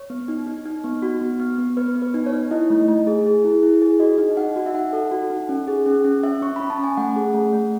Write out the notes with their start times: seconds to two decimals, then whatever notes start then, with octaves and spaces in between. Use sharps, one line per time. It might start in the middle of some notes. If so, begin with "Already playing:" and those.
Already playing: C#5
0.10 B3
0.28 D#4
0.47 D#4
0.65 D#4
0.84 B3
1.02 F#4
1.21 B3
1.40 B3
1.58 B3
1.77 B3 B4
1.95 B3
2.02 B4
2.14 D#4
2.26 C#5
2.33 D#4
2.51 E4 D#5
2.70 A3
2.88 A3
3.07 G#4
3.26 G#4
3.44 E4
3.63 E4
3.82 G#4
4.00 F#4 D#5
4.18 D#4
4.37 D#4 F#5
4.56 F#4
4.66 E5
4.74 D#4 F#5
4.93 A4
5.11 F#4
5.30 D#4
5.49 C#4
5.67 G#4
5.86 C#4
6.05 C#4
6.23 C#4 E5
6.42 C#4 C#6
6.56 C#4 B5
6.70 A5
6.79 C#4 G#5
6.97 A3 F#5
7.16 G#4
7.34 A3
7.53 A3